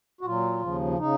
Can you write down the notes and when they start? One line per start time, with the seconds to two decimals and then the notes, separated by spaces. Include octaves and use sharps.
0.21 F#4
0.25 A#2 F#3 F4
0.61 D#2 C#3 F3
0.98 C#3 D#4